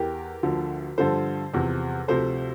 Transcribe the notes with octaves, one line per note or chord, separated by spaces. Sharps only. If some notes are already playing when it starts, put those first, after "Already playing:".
Already playing: E2 E3 G4 A#4
D2 D3 F3
G2 D3 F3 A4 C5
E2 C3 F3
D2 C3 F3 A4 C5